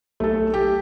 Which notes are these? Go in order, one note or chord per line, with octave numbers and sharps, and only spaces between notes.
B1 A3 A4
G4